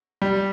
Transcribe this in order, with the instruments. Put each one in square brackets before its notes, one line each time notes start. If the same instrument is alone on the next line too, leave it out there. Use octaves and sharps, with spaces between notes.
[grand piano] G3